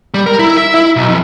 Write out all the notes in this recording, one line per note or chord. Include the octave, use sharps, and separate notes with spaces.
G3
A#4
E4
E5
E4
B1
F2